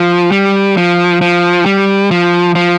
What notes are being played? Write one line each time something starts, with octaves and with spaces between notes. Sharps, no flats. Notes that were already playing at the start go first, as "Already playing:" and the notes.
Already playing: F3
G3
F3
F3
G3
F3
F3